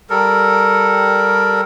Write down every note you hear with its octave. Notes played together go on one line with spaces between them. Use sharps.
G3 A4 A#4